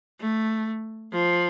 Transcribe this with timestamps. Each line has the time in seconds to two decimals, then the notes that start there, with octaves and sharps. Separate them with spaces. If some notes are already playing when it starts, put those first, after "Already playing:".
0.20 A3
1.13 F3